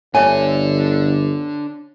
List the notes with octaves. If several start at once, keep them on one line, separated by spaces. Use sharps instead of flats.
G1 D4 A4 C#5 D5 E5 G#5